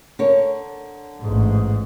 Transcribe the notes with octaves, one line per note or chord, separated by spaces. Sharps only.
D3 A#4 C#5
A1 G#2